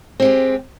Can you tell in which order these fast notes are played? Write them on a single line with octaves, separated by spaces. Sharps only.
C4 G#3 G4